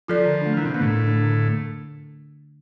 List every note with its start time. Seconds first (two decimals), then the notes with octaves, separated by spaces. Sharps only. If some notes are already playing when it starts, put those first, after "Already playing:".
0.08 F3 F4 A4 D5
0.25 D3
0.41 A3 D4
0.57 D3 E3
0.65 C3
0.74 B2 A3 D4
0.82 A2
0.90 D3
1.06 A3 D4
1.23 D3